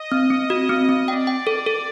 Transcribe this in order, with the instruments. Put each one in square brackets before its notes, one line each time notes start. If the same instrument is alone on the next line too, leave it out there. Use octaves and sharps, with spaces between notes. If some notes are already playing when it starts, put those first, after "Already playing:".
Already playing: [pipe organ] D#5
[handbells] C4
C4
F#4
C4
C4
[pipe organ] D5 [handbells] G5
[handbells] G5
A4
A4